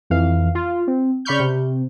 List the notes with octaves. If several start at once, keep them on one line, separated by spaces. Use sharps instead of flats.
F2 E3 F5
F4
C4
C#3 D5 B5 C#6 F6 G6
C3